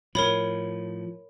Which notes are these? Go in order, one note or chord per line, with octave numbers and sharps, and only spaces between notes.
A2 F3 A#4 C#5 B5